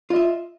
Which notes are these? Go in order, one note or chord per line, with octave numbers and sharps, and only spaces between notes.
F4 D#5 E5